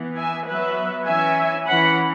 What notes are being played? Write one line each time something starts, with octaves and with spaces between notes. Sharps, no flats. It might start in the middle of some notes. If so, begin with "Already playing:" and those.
Already playing: E3 B3
E5 G#5
F#3 B3 B4 E5
E3 C#4 E5 G#5
E3 C#4 F#5 B5